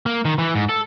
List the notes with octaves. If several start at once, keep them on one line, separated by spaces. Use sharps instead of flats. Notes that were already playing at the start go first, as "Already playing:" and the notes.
A#3
D#3
E3
G#2
A4